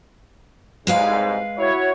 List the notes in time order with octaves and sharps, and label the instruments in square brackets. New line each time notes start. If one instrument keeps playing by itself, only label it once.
[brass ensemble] C2 G#2 [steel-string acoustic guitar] G#3 B4 F5
[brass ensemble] E4 F#4 C#5